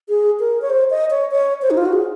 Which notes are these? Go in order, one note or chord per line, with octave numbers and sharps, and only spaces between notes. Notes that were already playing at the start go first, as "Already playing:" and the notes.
G#4
A#4
C#5
C5
D#5
C#5
C#5
C5
D#4
F4
F#4
G#4